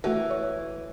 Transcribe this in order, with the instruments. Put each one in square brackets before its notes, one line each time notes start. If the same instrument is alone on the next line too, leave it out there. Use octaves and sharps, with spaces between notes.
[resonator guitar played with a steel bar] E3 [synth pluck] A3 F#4 A4
[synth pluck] C#5